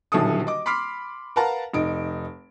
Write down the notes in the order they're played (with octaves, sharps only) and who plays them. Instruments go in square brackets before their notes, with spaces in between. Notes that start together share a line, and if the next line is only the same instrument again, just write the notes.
[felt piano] D#1 B1 D3 E4 A4 D#6
D#5 D6
B5 C6 D6 F6 B6 C7
A#4 B4 F5 F#5 A5 A#5
F1 D#4 D7